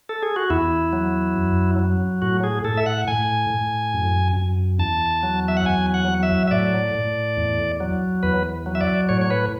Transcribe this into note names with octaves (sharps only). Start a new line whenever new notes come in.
A4
G#4
F#4
E2 E4
F#3
F#2
F#3
A2 F#4
G#4
A2 A4
E5
F#5
A2 G#5
A2
F#2
F#2
E2 A5
F#3
E5
F#5
E2 G#5
F#5
F#3
E5
E5
A2 D5
A2
E2
F#3
E2 B4
F#3
E5
D5
A2 C#5
C#5
B4